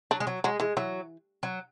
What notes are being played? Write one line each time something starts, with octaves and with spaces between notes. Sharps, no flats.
F#3 D4
G#3
F#3
F#3 G#3
E3 G#3
E3 F#3
F#3